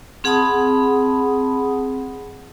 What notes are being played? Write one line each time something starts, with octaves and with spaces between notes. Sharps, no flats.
C4 G#4 F#5 A5 B5 D#6